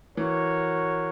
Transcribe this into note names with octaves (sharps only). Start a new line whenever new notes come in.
E3 F#4 A#4 C#5